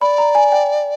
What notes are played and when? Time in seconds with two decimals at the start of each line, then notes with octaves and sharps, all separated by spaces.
0.01 D5 B5
0.18 A#5
0.35 G#5
0.52 G5